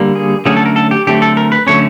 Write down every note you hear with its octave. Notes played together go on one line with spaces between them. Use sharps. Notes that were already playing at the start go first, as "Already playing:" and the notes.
Already playing: D3 G3 A#3
G#4
D3 F#3 A3 C#4 G#4
A4
A#4
A4
G4
D3 F#3 A3 C4 G4
A4
A#4
B4
D3 F#3 A3 C#4 C#5